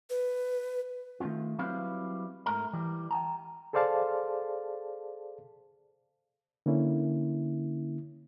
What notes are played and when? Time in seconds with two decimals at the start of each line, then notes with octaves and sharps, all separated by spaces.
0.10 B4
1.20 D#3 A3 C#4 D4 F4
1.59 F#3 G3 C4 E4 B4 F5
2.46 G#2 A3 A#4 A#5
2.73 E3 G3
3.11 G5 A5 A#5
3.73 G#4 A4 C5 D5 F5 A5
6.66 D3 A#3 C#4 E4